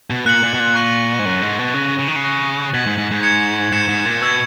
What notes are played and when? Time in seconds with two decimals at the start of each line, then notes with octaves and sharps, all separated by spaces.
0.10 B2
0.26 A#2 F#6 C#7 F#7
0.43 A#2
0.54 B2
0.60 A#2
0.75 C#6 F#6 A#6 D#7 F#7
1.19 G#2
1.25 F#2 F#6 A#6 C#7 F#7
1.42 G#2
1.59 B2
1.74 C#3 D#6 A#6 D#7 F#7
1.99 C#3
2.08 D#3
2.16 C#3
2.24 C#6 F#6 A#6 C#7
2.74 B2 G#6 B6 F#7
2.86 G#2
2.98 G#2
3.11 G#2
3.23 D#6 G#6 C#7 E7
3.72 G#2 G#6 C#7 E7
3.89 G#2
4.05 A#2
4.21 B2 C#6 E6 G#6